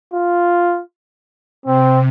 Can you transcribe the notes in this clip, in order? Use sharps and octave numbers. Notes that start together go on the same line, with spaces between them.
F4
C3 C4